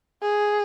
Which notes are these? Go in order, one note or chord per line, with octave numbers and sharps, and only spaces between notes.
G#4